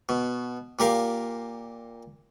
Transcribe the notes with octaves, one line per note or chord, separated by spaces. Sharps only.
B2
A#2 G4 A#4 F5